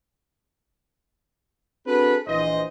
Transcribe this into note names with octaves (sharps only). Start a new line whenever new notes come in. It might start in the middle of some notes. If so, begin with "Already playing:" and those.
C4 D4 F#4 G#4 A4 B4
A#1 E3 C5 D#5